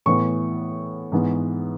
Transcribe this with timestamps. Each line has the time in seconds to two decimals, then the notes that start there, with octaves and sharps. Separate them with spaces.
0.06 A2 E3 B3 C#6
1.12 G#2 E3 B3